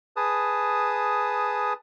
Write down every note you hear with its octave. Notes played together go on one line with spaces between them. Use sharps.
G#4 B4 A5 D#6